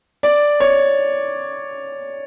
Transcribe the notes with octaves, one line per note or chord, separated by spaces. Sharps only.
D5
C#5